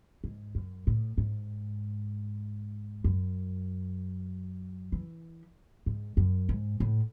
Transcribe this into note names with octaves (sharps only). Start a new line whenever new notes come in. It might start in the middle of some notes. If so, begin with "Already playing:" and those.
G#2
F#2
A2
G#2
F#2
E3
G#2
F#2
G#2
A2